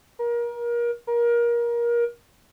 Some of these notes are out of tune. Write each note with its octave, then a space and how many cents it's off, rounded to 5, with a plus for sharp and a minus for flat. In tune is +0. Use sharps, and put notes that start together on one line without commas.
A#4 +30
A#4 +25